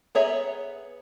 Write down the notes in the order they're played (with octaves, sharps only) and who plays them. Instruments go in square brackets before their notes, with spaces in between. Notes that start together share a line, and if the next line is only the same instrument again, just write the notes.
[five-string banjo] B3 G#4 C#5 E5 A#5